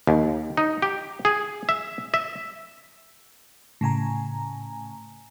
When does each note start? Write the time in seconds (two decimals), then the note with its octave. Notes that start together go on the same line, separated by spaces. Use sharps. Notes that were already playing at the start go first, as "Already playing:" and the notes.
0.07 D#2
0.57 D#4
0.82 G4
1.25 G#4
1.69 E5
2.14 E5
3.81 A2 C#3 G#5 A#5